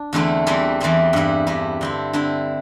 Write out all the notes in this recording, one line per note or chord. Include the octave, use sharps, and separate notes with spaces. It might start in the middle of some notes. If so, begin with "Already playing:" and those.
Already playing: D4
E2 D3 A3 C4 E4
E2 E3 G3 C4 E4
E2 E3 G3 C4 E4
G2 G3 E4
G2 G3 E4
D3 C4 E4
D3 C4 E4